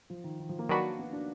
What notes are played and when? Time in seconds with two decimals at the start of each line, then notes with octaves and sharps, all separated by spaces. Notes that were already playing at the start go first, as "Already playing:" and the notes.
0.10 F3
0.24 D#3
0.39 D#3
0.49 F3
0.59 A#3
0.69 D#3 F#3 D4 F#4 B4
0.99 B3
1.13 D4